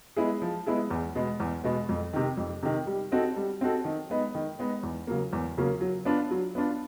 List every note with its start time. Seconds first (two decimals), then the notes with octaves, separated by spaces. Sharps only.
0.16 G#3 B3 E4 G#4
0.42 F3
0.66 G#3 B3 E4 G#4
0.91 E2
1.15 B2 G#3 B3
1.40 E2
1.64 B2 G#3 B3
1.89 F2
2.13 C3 D#3
2.37 F2
2.63 C3 D#3
2.87 G3
3.12 C4 D#4 F#4 A4
3.36 G3
3.61 C4 D#4 F#4 A4
3.85 D#3
4.10 G#3 B3 D#4
4.35 D#3
4.59 G#3 B3 D#4
4.83 E2
5.07 C#3 F#3 A#3
5.33 E2
5.57 C#3 F#3 A#3
5.81 F#3
6.05 B3 D4 F4
6.31 F#3
6.55 B3 D4 F4